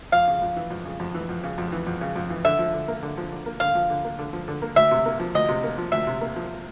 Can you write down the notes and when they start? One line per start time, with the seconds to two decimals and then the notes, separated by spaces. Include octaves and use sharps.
0.12 F2 F5
0.27 C#3
0.42 F2
0.56 E3
0.71 F2
0.85 C#3
1.00 F2
1.14 E3
1.29 F2
1.43 C#3
1.58 F2
1.72 E3
1.87 F2
2.01 C#3
2.16 F2
2.30 E3
2.45 D3 E5
2.59 F3
2.74 D3
2.88 A#3
3.02 D3
3.17 F3
3.32 D3
3.46 A#3
3.60 D3 F5
3.75 F3
3.90 D3
4.04 A#3
4.19 D3
4.33 F3
4.48 D3
4.62 A#3
4.76 D2 E5
4.91 C3
5.06 A#3
5.20 F3
5.35 D2 D#5
5.49 C3
5.64 A#3
5.78 F3
5.92 D2 E5
6.07 C3
6.21 A#3
6.36 F3